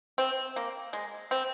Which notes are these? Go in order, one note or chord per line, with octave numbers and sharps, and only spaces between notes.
C4
A#3
G#3
C4